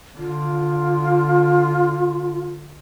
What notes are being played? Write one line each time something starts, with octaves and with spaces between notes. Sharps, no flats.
D3 F4